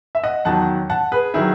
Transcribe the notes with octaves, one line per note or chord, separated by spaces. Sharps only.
E5
D#5 F#5
E2 D#3 F#3 F#5 A5
F#5 A5
G#4 B4
D#3 F#3 E4 G#4